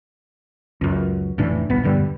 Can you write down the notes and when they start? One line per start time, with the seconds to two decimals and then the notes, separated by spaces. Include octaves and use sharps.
0.81 C#2 F#2
1.38 F1 A2 E3 D4
1.70 D1 G1 B3
1.84 E1 G2 D3 G3